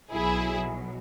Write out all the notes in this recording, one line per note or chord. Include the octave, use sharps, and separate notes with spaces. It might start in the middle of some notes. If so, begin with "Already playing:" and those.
B1 B2 F#3 E4 G#4